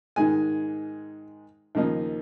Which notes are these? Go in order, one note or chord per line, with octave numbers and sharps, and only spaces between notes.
G#2 D#3 G#3 G#5
D#2 C#3 F3 A#3 D#4